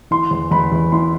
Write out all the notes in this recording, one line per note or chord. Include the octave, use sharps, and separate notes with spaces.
E3 C6
E2
E2 B5
E2
E3 C6